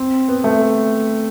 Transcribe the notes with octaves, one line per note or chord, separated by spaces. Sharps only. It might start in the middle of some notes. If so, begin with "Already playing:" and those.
Already playing: C4
B3
A3